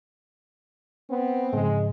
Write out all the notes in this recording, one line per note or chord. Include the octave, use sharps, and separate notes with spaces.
B3 C4
G#2 C#3 F3 G#3